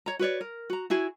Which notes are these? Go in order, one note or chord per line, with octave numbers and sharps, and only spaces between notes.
C#5 A#5
F#4 B4 C#5 D5
A#4
F#4 A#5
E4 F#4 G#4 G#5